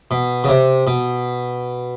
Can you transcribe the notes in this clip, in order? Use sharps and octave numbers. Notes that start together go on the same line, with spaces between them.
B2
C#3
C3
B2